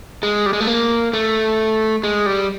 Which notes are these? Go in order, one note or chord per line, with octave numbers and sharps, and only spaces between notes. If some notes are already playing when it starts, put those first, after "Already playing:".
G#3
G3
G#3
A3
A#3
A3
G#3
G3